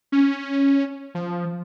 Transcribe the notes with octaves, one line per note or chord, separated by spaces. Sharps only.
C#4
F3